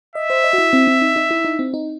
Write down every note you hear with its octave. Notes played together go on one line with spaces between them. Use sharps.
D#5 E5
C5
D#5
F#4
E4
C4
C4
D#4
D#4
E4
D#4
C4
D#4